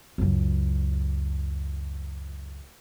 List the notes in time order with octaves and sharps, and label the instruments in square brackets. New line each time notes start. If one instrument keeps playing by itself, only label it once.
[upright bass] C#2 F#2